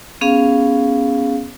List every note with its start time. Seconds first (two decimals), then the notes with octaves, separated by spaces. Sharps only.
0.21 B3 C#4 G#4 F5